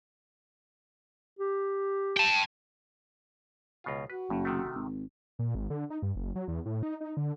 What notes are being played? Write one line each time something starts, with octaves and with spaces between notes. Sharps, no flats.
G4
G5 A5
C#2 B2 F4
F#4 B4
F#1 G2
C3 D#3 A3
G#1
A#2
G#1
D3
D#4
G2
F#1
F#3
E2
A2
D#4
D#4
D3